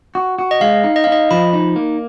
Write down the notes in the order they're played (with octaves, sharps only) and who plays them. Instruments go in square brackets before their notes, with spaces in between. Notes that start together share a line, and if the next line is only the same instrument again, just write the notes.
[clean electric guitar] F#4
F#4
[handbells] D#5
[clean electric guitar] G#3 [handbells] F5
[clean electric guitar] D#4
[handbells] D#5
F5
[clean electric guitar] D#4 [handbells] D#5
[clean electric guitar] F3 [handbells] B5
[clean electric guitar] D#4
A#3